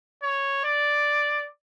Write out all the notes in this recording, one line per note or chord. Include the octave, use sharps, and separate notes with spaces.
C#5
D5